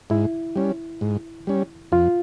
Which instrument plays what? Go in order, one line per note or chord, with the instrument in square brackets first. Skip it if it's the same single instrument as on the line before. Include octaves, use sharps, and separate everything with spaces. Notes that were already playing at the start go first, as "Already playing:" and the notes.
[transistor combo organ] G#2 [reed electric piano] E4
[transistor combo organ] G3 C#4
G#2
G3 C#4
[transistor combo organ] F2 [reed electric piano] F4